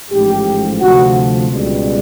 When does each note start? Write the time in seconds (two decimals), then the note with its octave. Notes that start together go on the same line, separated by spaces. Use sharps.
0.11 A1 G#2 F3 G4
0.81 D2 C3 F3 F#4
1.50 C#2 B2 G3